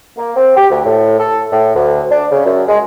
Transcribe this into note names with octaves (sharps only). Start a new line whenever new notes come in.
A#3
C4
G4
D2
A2
A4
A2
D2
D4
C#3
F#2
G#3